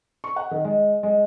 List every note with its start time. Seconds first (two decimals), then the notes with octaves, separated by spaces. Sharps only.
0.24 C#6
0.36 F#5
0.51 D#3
0.64 G#3
1.03 G#3